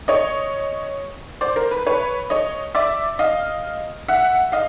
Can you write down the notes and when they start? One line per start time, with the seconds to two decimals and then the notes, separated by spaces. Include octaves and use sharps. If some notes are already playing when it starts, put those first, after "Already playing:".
0.08 C#5 D#5
1.41 C5 D5
1.56 A#4 C5
1.71 B4
1.87 B4 C#5
2.30 C#5 D#5
2.75 D5 E5
3.19 D#5 F5
4.08 E5 F#5
4.52 D#5 F5